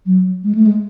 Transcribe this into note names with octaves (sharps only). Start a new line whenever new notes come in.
F#3
G#3
A3
G#3